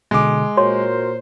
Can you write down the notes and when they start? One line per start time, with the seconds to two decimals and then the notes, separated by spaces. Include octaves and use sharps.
0.11 B2 D3 G#3 D6
0.57 A#2 F#4 A#4 C5 C#5 C6